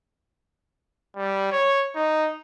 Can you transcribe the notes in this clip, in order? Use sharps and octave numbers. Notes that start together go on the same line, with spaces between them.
G3
C#5
D#4